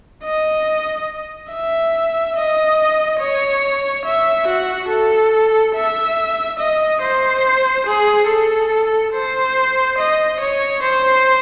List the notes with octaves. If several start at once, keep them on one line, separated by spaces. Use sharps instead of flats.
D#5
E5
D#5
C#5
E5
F#4
A4
E5
D#5
C5
G#4
A4
C5
D#5
C#5
C5